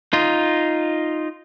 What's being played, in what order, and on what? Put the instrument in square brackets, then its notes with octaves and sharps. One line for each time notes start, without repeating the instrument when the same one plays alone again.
[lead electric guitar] D#4 F4